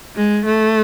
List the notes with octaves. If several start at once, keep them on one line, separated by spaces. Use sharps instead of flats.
G#3
A3